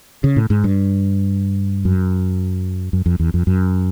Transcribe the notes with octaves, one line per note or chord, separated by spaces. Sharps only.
C#3
A2
G#2
G2
F#2
F#2
F2
E2
F2
F#2